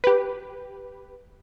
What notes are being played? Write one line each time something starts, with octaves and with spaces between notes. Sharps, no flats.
G4 B4